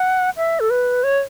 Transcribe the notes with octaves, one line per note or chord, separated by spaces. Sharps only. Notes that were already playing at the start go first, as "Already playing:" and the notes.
Already playing: F#5
E5
A4
B4
C#5